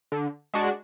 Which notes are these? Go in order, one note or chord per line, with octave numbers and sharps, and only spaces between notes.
D3
G#3 D4 F#4